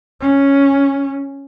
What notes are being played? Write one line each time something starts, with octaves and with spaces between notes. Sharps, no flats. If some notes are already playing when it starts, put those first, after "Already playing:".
C#4